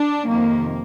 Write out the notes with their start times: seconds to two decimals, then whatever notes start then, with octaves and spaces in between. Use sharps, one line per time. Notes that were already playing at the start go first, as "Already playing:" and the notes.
Already playing: D4
0.26 F2 C3 D#3 A#3